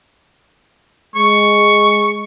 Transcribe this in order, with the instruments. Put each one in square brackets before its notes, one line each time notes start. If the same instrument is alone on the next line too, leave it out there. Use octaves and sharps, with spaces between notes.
[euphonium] G#3 [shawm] C#6